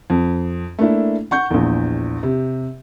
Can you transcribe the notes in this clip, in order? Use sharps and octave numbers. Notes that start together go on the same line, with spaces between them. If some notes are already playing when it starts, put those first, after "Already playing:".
F2
A3 A#3 D4 E4
F#5 C#6 G6
A#1 E2
C3